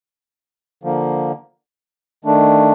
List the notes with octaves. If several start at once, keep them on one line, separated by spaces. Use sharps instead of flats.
D3 F3 A#3
D#3 A3 D4